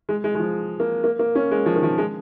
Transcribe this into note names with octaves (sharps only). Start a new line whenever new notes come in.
G#3
G#3
G#3
F3
A#3
A#3
A#3
C#4
G#3
F3
D#3
F3
G#3